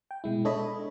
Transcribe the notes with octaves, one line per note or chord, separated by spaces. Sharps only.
G5
B2 G#3 E4
D4 A4 C#5 D#5 E5 B5